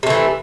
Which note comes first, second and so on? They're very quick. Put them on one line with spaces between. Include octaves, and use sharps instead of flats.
C3 A3 E3